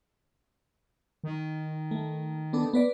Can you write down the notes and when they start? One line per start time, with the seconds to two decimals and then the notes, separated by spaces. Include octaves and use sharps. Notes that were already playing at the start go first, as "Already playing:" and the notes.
1.24 D#3
1.91 A3
2.53 B3 D4 A4
2.73 B3 B4 D5